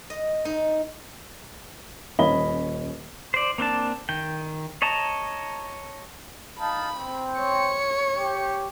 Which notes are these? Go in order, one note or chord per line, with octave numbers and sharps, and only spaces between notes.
D#5
D#4
D#1 C#4 D#5 B5 G7
C5 D5
A#3 C4 D4 A5
D#3 G5
C#5 D#5 A5 A#5
D#4 F5 A5 B5
C4
C#5 C#7
G4